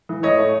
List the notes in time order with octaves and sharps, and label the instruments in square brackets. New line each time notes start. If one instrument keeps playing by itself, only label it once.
[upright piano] E3
A2 C#5 D#5
A3